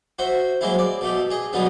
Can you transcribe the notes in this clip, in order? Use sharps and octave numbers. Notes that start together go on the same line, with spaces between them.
F#4 C5 E5
F#3 G#3 A#3 C4 E4
D5
B2 A3 G4
G#4 D#5
G2 B2 D3 F#3 G3 B3